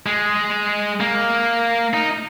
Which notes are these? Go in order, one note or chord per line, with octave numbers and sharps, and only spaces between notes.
G#3
A#3
D#4